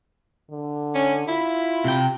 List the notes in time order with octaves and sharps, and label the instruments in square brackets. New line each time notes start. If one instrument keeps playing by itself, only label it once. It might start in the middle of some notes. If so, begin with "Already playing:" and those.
[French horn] D3
[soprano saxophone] C#4
[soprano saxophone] E4 [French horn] F4
[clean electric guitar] C3 G5